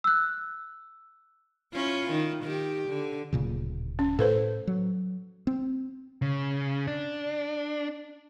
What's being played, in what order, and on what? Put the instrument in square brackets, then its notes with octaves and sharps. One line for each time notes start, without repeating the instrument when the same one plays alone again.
[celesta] E6 F#6
[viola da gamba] C#4 E4 F4
D#3
D#3 G4
D3
[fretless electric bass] D1 A#2 C#3
[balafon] C#4
[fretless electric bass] A2 [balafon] A4 B4 C5
[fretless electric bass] F#3
C4
[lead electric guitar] C#3
D4